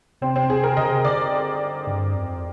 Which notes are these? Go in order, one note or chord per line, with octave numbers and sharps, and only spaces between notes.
C3 C4
C4
C3 G#4
A#4
D3 D#5
C3
D3 D5
G2
F2